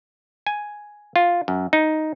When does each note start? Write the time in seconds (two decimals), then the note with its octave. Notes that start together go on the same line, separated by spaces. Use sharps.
0.47 G#5
1.16 F4
1.48 F#2
1.73 D#4